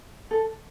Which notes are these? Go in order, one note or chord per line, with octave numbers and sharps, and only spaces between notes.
A4